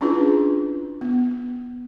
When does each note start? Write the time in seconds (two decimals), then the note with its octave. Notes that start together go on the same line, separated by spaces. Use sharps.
0.01 C#4 D4 E4 F4 G#4 B4
1.01 B3